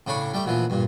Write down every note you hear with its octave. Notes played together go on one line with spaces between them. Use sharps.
A2 C#3 D4 B5 C#6
G3 A3 G4
D2 A#2 E3 F3
G2 A#2